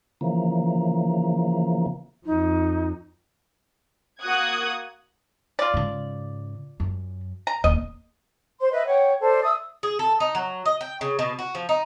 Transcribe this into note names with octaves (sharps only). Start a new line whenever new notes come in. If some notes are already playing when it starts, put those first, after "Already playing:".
C#3 E3 F3 A#3
F2 D#4
A#3 F#4 D#6 F#6 G#6
F4 D5
G#2 C#3
F#2
A#5
D#1 E3 D#5
C5 C6
B4 D#5 E5
C#5 F#5 G5
A4 C5 D5
E5 D#6 E6
G#4
A4
D#4
F#3
D#5
G5
C#3
B2
F#4
F3
D#4